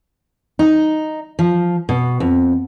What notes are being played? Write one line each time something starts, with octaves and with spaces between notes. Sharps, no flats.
D#4
F3
B2
F2